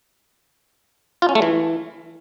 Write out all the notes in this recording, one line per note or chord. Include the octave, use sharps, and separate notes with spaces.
F4
C#4
A3
E3